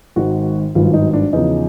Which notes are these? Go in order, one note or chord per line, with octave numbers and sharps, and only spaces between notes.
G#1 G#2 D#3 F#4
G#1 G2 D#3 F#3 F4
D#4
D4
E2 C#3 F3 D#4